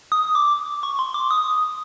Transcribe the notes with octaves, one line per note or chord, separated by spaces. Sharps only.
D#6
D6
C#6
C6
D6
D#6